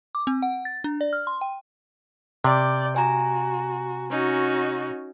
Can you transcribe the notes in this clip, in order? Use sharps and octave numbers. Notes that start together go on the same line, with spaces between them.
D6
C4
F#5
A6
D4
D5
F6
C6
G5
C3 D5 G6
F#4 G#5 A#5
C#4 D#4 F#4